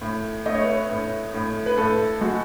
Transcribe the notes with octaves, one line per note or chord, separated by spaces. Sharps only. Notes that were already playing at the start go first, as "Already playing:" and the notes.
A2
A3 D#5
C#5
B4
C#5
A2
A2
B4
A2 A4
G#3 F#4